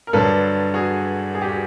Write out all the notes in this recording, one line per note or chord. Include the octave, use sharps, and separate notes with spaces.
A#4
G2 D3 F#3 A4 B4
F#4 G#4
G#4
G4
F#4